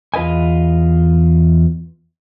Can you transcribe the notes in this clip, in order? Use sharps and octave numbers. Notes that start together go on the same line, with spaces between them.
E2 F4 B4 D#5 G#5